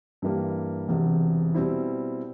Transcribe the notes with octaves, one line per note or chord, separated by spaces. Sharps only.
G2 E3 G3 A#3
E1 E2 C3
B2 G3 C4 E4